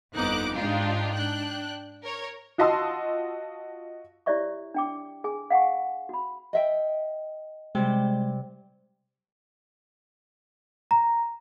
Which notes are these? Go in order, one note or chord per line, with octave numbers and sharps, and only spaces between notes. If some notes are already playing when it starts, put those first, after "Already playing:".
G1 F2 B3 D#4 D6 F#6
G#2 G#3 D4 D#4 F4 G4
D4 G5 F#6
A#4 C#5
F4 F#4 D#5 A5 C6 E6
E4 G4 C#5 D5 E5 C#6
D4 G5 D6
G#4 G#5
F5 F#5 G#5 C#6
F#4 B5
D#5 E5 G5
C3 G3 G#3
A#5